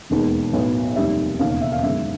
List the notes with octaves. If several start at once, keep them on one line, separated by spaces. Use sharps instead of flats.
E1 D#2 D#3 G#3 B3
B1 A2 F#3 B3
F1 D#2 D#3 G3 E5
E1 D#2 C#3 F5
F5
E5
F5
G1 F#2 D#3 G#3 E5